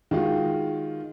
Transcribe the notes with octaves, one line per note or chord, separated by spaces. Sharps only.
D#3 G#3 F4 F#4